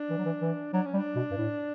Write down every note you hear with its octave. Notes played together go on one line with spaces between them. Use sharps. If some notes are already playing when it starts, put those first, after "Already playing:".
Already playing: D4
E3
F#3
E3
E3
F#3 D4
C#4
G3
D4
B2
G2
A2